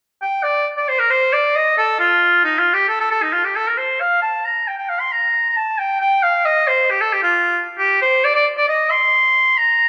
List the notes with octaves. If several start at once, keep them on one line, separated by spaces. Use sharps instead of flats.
G5
D5
D5
C5
A#4
C5
D5
D#5
A4
F4
D#4
F4
G4
A4
A4
A4
D#4
F4
G4
A4
A#4
C5
F5
A5
A#5
G5
G5
F5
C6
A#5
A#5
A5
G5
G5
F5
D#5
C5
G4
A4
G4
F4
G4
C5
D5
D5
D5
D#5
C6
A#5